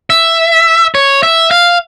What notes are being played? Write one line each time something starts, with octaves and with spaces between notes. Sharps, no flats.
E5
C#5
E5
F5